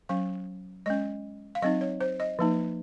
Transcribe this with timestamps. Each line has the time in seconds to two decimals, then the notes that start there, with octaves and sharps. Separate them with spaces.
0.09 F#3 C#4 F5
0.86 G#3 C#4 D#5
1.55 F5
1.62 F#3 C4 D#4 D#5
1.81 C#5
2.01 C5
2.20 D#5
2.39 F3 A#3 D#4